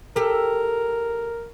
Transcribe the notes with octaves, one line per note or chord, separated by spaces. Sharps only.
G4 A4 A#4